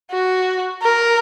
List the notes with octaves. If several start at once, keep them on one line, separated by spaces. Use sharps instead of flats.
F#4
A#4